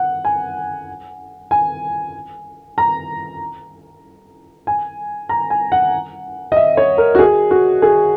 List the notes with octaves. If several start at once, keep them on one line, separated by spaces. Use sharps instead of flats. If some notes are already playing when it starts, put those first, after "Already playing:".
Already playing: F#5
G#5
G#5
A#5
G#5
A#5
G#5
F#5
D#5
E5
C#5
A#4
F#4
G#4
F#4
G#4